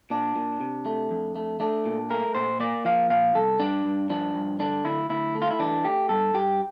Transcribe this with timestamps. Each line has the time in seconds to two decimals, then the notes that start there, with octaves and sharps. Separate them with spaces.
0.10 A#2 D4
0.36 A#2
0.61 C3
0.86 A3
1.11 F2
1.36 A3
1.60 A3 D4
1.86 A#2
2.10 A3 A#4
2.35 A#2 C5
2.60 A#3 D5
2.85 F3 F5
3.10 A#2 F5
3.35 C2 A4
3.60 G2 D4
3.85 G2
4.10 F3 D4
4.35 G2
4.59 D3 D4
4.85 D2 E4
5.09 D2 E4
5.35 A3
5.42 F4
5.51 E4
5.59 E3 D4
5.84 A3 G4
6.09 G2 A4
6.34 G2 G4